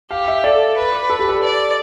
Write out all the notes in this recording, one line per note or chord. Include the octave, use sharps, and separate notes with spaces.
G4 F5
E5
A4 D5
B4
A4
G4
A4
D5